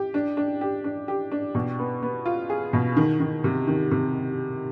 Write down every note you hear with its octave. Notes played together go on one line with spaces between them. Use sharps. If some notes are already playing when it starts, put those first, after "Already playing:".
Already playing: G4
D4
D4
G4
D4
G4
D4
B2
B3
B3
F4
G#4
B2
D#3
D#3
C3
D#3
C3